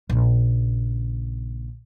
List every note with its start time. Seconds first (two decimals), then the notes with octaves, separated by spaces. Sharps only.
0.10 A#1 C#3